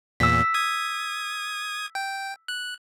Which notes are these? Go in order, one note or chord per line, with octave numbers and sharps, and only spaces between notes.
E2 A#2 E6 B6
D#6 G#6
G5
F#6